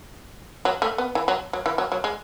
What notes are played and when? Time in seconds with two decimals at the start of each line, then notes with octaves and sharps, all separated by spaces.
0.65 F#3
0.82 A3
0.98 B3
1.15 E3
1.28 F#3
1.53 F#3
1.66 E3
1.78 F#3
1.92 F#3
2.04 G#3